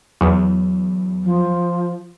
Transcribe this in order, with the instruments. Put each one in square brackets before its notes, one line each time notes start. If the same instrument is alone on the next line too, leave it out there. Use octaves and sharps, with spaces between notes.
[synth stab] E2 [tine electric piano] F#3
[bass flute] F3